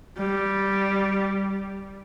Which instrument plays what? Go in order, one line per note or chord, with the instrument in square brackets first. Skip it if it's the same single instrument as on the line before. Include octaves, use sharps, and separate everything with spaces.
[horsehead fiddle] G3